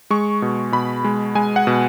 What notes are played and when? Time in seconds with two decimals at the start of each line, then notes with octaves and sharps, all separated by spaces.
0.10 G#3 C#6
0.42 B2
0.72 B2 B5
1.04 G#3
1.35 G#3 G#5
1.56 F#5
1.67 B2